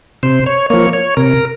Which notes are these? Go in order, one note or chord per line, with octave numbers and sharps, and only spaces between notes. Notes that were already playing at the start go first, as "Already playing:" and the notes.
C3 C5
C#5
F3 A#3 C#5
C#5
C3 A#4